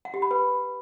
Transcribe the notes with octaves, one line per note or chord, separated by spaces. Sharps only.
F#5
G4
B5
B4